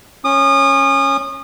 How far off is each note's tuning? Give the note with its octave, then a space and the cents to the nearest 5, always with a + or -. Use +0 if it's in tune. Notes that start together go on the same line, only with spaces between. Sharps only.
C#4 -15 D#6 -30